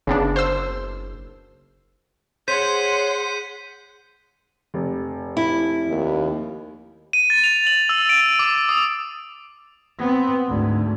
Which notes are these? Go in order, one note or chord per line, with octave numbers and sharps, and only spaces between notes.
F#1 C#3 B3 D4
C5 E6
G#4 C5 C#5 F#5 C6 G6 B6 D#7
F1
E4
D#2
D#7
A6
F7
F#7
E6
D7
D6
D#6
B3 C4
D2 G#2